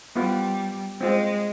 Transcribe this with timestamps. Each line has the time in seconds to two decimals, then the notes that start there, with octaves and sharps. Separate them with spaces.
0.16 G3 B3 F4 B4
1.01 G#3 C4 F4 C5 G5